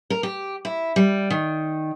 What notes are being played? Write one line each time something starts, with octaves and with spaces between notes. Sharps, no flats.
A#4
G4
E4
G3
D#3